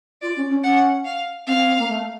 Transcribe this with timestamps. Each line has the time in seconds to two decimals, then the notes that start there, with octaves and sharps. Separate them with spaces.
0.22 F4 D5
0.36 C#4
0.49 C#4
0.63 C#4 F#5
1.05 F5
1.47 C4 F5
1.57 C4
1.67 C4
1.78 A#3
1.89 A3